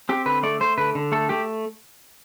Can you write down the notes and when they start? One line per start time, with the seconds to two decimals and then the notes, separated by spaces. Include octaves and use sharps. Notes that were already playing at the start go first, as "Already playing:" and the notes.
0.09 C4 G4
0.26 D3 B4
0.43 A3 D5
0.60 A3 C5
0.78 D3 B4
0.95 D3
1.12 A3 A4
1.29 A3 G4